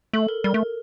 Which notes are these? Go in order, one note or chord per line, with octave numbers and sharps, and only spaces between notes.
A3 A4
A#4
G3 A#4
A3